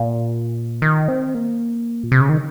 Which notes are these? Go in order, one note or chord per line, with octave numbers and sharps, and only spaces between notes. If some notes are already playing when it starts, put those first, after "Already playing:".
Already playing: A#2
D#3
C4
A#3
A#2
C3
C#3
D#3